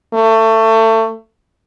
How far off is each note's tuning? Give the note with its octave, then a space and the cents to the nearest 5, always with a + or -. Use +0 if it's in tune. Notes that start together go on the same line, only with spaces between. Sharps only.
A3 +25